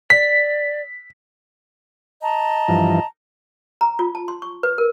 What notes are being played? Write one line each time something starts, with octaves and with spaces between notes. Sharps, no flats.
D5 B6
D#5 A5 A#5
G2 E3 F3
A#5
F4
A5
C6
C#6
B4
A#4